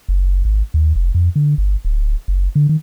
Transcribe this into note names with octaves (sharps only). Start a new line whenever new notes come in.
F#1
G#1
D#2
F1
F2
D3
G1
D1
F#1
D3
D#3